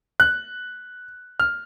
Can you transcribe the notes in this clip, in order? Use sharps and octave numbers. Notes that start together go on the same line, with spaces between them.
F#6
F6